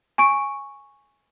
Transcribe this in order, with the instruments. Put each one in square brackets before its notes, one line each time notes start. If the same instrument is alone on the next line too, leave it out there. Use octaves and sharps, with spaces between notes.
[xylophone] G#5 C#6 D7